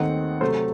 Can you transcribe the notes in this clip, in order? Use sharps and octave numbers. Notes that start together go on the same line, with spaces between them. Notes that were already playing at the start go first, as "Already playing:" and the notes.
Already playing: D#2 D#3 A3 C4 D#4 F#5
C3 F#3 A3 C5